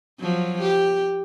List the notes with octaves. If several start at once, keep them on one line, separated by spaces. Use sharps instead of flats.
F3 F#3
G4